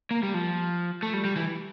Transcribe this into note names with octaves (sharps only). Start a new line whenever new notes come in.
A#3
G3
F3
A3
G3
G3
E3